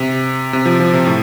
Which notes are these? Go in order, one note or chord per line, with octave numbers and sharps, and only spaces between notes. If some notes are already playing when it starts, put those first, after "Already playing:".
Already playing: C3
C3
F3
F3
C3
A2